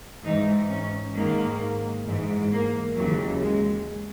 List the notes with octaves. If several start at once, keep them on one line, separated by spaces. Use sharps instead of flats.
G#2 E3 D#4
C#4
G#2 D#3 A#3
G#2 E3
A#3
D#2 C#3 E3 F#3
G#3